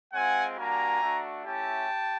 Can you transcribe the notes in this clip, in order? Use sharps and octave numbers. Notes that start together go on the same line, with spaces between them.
G#3 C4 F4 F#5 G#5
G3 A#3 D4 F#4 G#5 A#5
A3 D4 F#4
A3 C#4 E4 G4 G5 A5
G4